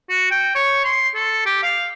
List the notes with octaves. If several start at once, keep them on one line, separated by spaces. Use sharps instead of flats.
F#4
G5
C#5
C6
A4
G4
F5